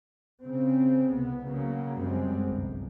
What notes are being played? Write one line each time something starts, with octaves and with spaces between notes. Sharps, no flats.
C#3 C4
C2 B3
C#3 F#3 A#3
F#2 G3 G#3 C4
G1 C2